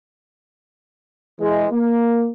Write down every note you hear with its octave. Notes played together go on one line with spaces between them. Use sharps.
E3 G#3
A#3